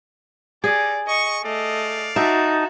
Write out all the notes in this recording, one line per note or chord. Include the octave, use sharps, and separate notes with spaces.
G3 D#4 G#4 D5
D#5 C#6
A3 D5 D#5 F5
D#4 F#4 E5 A5